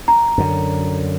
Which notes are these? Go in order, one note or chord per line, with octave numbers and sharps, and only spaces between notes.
A#5
F#2 D3